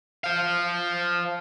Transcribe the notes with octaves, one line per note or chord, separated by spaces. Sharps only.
C5 F5